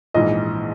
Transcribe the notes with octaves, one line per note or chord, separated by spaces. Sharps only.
A#1 G#2 E3 D#5